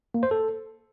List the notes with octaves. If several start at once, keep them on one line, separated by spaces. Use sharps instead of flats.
A#3
C5
A4